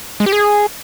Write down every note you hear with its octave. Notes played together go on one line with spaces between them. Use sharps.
G#3
G4
G#4